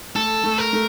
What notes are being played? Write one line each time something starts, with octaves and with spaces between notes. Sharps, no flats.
A3 A4
A3
A#4
A3